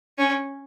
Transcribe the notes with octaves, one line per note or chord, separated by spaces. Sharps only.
C#4